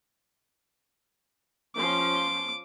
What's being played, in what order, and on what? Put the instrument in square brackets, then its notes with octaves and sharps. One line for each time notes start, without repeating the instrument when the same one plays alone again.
[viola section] F3 C#4 C6 [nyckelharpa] D6